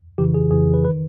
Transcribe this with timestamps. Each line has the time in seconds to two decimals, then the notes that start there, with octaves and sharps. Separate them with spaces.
0.18 F2 C#3 E3 G4
0.34 G#4
0.51 F2 C#3 E3 G#4
0.74 B4
0.84 B4
0.88 D#3